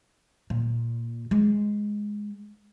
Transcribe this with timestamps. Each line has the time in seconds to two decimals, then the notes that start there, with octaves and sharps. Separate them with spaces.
0.50 A#2
1.31 G#3